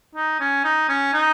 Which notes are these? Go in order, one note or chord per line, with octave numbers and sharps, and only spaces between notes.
D#4
C#4
D#4
C#4
D#4